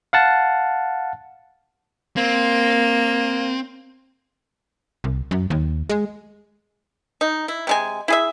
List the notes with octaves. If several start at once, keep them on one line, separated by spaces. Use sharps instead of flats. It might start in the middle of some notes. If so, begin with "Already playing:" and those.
F5 F#5 A5
A#3 C4
C2
F#2
D#2
G#3
D#4
E4
C3 G#3 G#5
E4 G#4 E5